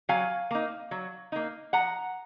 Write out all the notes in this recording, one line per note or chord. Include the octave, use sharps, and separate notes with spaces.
F#3 F5 G#5
A#3 D#4
F#3
A#3 D#4
F3 F#5 A#5